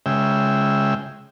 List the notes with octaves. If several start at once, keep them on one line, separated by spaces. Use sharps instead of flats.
C#3 G#3 E5 G5